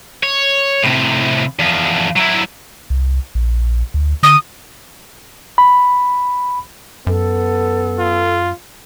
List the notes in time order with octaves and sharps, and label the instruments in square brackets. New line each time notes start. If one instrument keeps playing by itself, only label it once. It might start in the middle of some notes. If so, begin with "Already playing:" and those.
[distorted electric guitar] C#5
A2 C3
E2 F3
F#3 E4
[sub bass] C2
A#1
D2
[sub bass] D3 [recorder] D#6
[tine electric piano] B5
[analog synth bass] F#2 [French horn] B3 [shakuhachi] A4
[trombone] F4